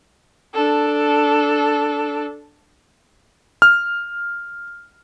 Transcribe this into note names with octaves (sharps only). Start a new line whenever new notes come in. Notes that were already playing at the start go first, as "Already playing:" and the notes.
D4 A4
F6